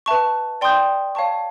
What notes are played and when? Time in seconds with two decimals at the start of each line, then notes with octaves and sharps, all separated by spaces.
0.06 B4 E5 A5 C#6
0.61 D5 G5 C6 D#6 G6
1.15 C#5 F5 A5 C#6